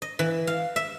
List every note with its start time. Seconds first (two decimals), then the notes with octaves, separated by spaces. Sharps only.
0.02 D#5
0.19 E3
0.47 F5
0.76 E5